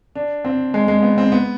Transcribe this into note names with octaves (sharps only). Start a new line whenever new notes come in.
D4
C4
G#3
G#3
B3
C4
B3